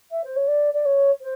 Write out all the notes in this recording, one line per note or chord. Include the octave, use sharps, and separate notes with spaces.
E5
C5
C#5
D5
D5
C#5
C5